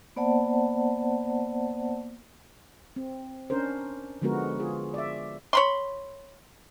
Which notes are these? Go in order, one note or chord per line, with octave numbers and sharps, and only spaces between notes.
A#3 B3 C5 D5 F#5 A5
C4
C#4 D4 A#4 C5
D3 F3 G#3 B3 F#4 A#4
F4 G#4
D5 E5
C#5 B5 C6